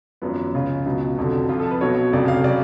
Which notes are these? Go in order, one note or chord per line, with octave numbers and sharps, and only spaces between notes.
G#1 F#2 F3 B3
C#2 C#3 F3 F4
C#2 B2 F#3
F1 F2 D3 F#3
F2 F3 F4
A4
B4
B1 B2 F#3 C#5
F1 F2 C#3 F#3 D5
F5
C#3 F#3 D5